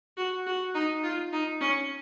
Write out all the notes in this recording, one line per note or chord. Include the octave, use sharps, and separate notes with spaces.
F#4
F#4
D#4
F4
D#4
C#4